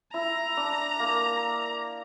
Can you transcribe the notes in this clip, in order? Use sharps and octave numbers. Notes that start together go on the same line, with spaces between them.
E4 A#5
D4
A#3